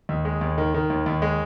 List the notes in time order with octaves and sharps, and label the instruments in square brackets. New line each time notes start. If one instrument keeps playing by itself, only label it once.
[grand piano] D#2
G#3
D#2
D#3
D#3
D#2
D#2
G#3